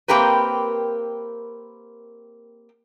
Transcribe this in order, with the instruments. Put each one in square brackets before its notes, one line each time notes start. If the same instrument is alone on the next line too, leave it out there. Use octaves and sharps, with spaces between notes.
[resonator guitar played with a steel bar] A#3 C4 G4 A#4 B4